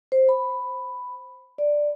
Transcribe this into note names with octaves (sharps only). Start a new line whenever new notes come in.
C5
B5
D5